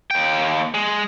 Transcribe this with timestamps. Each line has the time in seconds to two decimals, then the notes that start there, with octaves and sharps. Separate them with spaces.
0.11 D#2 G5
0.74 G#3